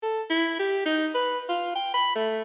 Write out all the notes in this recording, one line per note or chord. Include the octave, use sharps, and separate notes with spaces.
A4
E4
G4
D#4
B4
F4
G5
B5
A3